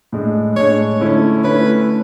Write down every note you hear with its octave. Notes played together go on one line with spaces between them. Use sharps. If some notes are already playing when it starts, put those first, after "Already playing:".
A2 G#3 D4
A2 G#3 D4 C#5
D3 A3 C#4 E4
D3 A3 C#4 E4 B4